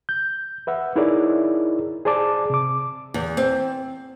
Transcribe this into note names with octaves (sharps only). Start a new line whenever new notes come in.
G6
B4 E5 F#5
D#4 E4 G#4 A#4 C#5 D5
G#4 C5 D5 A5 D6
C3 D6
E2
C4